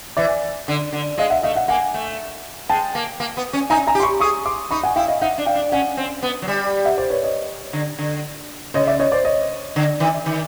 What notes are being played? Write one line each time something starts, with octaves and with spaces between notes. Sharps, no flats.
E3 D5 E5
D3
D3
G#3 D#5 F5
E5 F#5
A3 D#5 F5
E5 F#5
A#3 F#5 G#5
A3
G#3 G5 A5
A#3
A#3
B3
C#4
D#4 G#5 A#5
G#5 A#5
G4
C6
B5 C#6
G#4 C#6 D#6
C6 D6
D#4 B5 C#6
F#5 G#5
E4 F5 G5
D#5 F5
D#4 E5 F#5
D4
F5 G5
D4
C#4 F#5 G#5
C4
B3
F#3
G3
E5 F#5
C5 D5
B4 C#5
C#5 D#5
D3
D3
C#3 C#5 D#5
D5 E5
C#5 D#5
C5 D5
C#5 D#5
D3
D#3
D#3